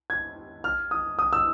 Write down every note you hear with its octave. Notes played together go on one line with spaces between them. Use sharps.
G#6
F6
D#6
D#6
E6